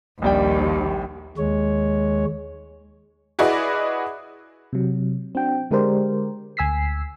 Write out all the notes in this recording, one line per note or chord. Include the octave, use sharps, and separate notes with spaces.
A#1 D#2 G3 G5
D#2 G#3 C#5
E4 F#4 G#4 B4 D5 D#5
C3 F#3
C4 D4 F#4 G5
D3 G#3 G4 A#4 C5 D5
D2 G#5 E6 B6 C7